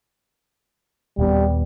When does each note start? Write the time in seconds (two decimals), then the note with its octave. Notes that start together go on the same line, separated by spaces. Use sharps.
1.18 D#1 G3 B3